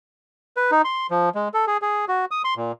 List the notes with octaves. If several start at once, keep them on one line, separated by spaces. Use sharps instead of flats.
B4
D#4
C6
F3
G#3
A4
G#4
G#4
F#4
D#6
C6
A#2